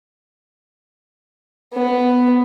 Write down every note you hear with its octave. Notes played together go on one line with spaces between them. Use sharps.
B3